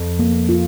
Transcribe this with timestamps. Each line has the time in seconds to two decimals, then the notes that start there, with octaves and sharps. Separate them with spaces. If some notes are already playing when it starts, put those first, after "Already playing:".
Already playing: F2
0.20 A#3
0.49 F4